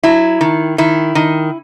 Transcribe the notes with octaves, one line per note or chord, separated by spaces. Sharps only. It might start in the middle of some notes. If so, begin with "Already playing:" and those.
F#3 E4
D#3
D#3 E4
D#3